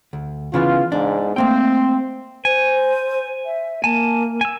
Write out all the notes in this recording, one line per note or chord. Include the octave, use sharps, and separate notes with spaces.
D2
C#3 E3 B3 F4
E2 G#2 D4
A3 A#3 C4 G5
C5 G#5
E5
A#3 G#5 A5
G#5 E6